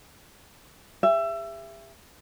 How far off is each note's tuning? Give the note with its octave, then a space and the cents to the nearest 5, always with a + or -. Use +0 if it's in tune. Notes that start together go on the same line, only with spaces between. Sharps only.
G4 +45 E5 +25